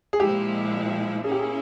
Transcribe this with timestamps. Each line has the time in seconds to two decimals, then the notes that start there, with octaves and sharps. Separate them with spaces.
0.13 G#4
0.20 A#2 F3 G#3 E4 G4
1.24 A#3 C#4 E4 G#4
1.32 G4
1.40 G#4